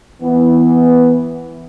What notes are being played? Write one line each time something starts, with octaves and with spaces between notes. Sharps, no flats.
E3 B3